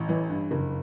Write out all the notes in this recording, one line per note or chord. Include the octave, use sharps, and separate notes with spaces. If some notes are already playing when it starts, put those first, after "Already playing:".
Already playing: A1
E3
G2
F#1